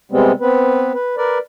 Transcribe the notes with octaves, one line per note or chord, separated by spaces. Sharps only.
C3 G3 G#3 B3 C4
B3 C4 B4
B4
A#4 B4 D5